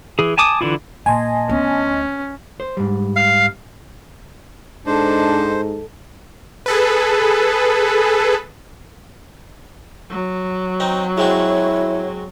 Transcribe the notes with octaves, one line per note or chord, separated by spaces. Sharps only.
E3 G#4
G#5 A5 D6 D#6
D3 E3 E4 F4
A#2 D#5 G#5 A5 C6
D2 B3 C#4
C5
G#2 G3
F5
G#2 D4 A4 C5 D#5
G#4 A4 B4
F#3
C4 D#4
G#3 C4 E4 F#4 C#5